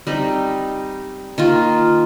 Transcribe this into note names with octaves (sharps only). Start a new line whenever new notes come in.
G3 C4 D#4
D#3 A#3 F4